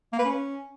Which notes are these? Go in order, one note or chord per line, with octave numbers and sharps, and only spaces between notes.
A#3
B4
C#4